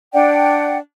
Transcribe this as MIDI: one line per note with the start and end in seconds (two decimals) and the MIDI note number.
0.13 0.77 62
0.13 0.77 74
0.13 0.77 78
0.13 0.77 79